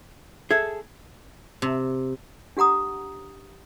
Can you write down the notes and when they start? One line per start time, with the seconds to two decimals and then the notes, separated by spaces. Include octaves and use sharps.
0.51 G#4 A4 E5 G#6
1.62 C3
2.57 D4 G4 F#5 A#5 D#6